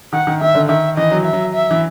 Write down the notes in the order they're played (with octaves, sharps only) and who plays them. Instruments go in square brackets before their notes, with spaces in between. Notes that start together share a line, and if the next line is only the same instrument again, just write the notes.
[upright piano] D#3 [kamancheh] F#5
[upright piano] D#3
[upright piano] D#3 [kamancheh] E5
[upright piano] D3
[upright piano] D#3 [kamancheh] E5
[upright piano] E3 [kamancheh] D#5
[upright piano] F#3
[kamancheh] E5
[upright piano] F#3
[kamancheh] E5
[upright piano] E3